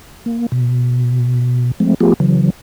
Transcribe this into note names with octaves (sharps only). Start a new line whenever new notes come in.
A#3
B2
F3 G#3 A3 C4
F3 A3 B3 F4 G4 G#4
C#3 E3 F#3